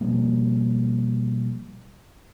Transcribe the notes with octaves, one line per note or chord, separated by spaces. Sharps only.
B2 F3 G3 A#3